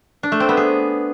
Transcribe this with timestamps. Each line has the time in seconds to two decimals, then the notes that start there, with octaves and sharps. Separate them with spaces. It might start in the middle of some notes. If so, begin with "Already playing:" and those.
0.23 D4
0.32 A3
0.40 C4
0.49 B3
0.57 G#4